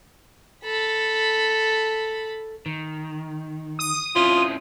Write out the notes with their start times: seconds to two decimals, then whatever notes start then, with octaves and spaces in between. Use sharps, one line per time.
0.64 A4 B5
2.66 D#3
3.79 D#6
4.16 C4 C#4 E4 F4